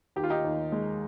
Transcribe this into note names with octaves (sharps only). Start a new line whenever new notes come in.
D#2 G4
F4
D#4 G4
D#2
G#3